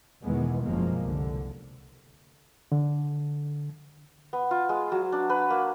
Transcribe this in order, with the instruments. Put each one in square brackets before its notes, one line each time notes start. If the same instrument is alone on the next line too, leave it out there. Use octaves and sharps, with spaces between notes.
[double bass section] E2 B2 D#3 E3 G#3 B3
F#1 F#2 B2 F3 G#3 A#3
C2 D3
[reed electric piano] D3
[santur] B3
F4
G#3
F#3
D4
B4
A#3